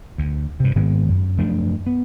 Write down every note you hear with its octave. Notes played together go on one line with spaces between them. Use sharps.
D2
G2 C3
G#2 D#3 G#3 B3
F#2
F#2 F3 A3 D4
B3